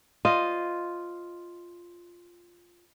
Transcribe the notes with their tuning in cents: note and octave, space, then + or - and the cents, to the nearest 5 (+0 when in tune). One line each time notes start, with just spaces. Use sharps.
F4 +0 C5 +0 D#5 +0